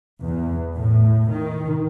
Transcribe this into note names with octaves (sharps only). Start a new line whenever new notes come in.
E2
A2
D#3